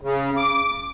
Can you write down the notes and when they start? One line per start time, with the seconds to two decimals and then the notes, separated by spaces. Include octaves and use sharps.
0.01 C#3
0.37 D6